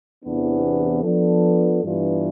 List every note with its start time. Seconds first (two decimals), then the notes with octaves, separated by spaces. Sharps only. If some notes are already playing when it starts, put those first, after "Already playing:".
0.23 E2 C3 E3 B3 D4
1.02 F3 B3 D4 A4
1.82 G2 E3 B3 D4 F4